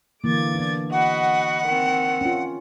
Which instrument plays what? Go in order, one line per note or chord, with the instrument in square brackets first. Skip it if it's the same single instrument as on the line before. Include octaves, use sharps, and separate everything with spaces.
[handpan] D3 E3 A#3 [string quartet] D6 G#6 A6
[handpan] B3 D4
[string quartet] F#4 D#5 B5 [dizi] F#5
[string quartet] D#3 C4
[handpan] C#4 F4